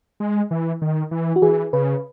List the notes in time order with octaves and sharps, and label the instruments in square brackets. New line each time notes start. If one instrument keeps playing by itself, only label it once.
[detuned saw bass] G#3
E3
D#3
E3
[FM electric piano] F#4
[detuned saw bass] E3 [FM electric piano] G#4
[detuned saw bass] C#3 [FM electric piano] B4